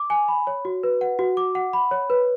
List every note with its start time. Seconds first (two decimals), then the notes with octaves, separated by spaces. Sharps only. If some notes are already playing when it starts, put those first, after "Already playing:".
Already playing: D6
0.10 G#5
0.28 B5
0.47 C#5
0.65 F#4
0.83 B4
1.01 F#5
1.19 F#4
1.37 D6
1.55 F#5
1.73 B5
1.91 C#5
2.10 B4